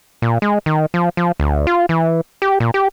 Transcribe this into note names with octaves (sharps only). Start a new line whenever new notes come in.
A#2
G#3
D#3
F3
F3
D2
F4
E3
G4
A#2
G4